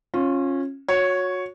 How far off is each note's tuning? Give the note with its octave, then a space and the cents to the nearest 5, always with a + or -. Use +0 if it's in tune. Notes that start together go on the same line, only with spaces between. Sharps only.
C#4 -20 F4 +10
F#4 -25 C#5 +0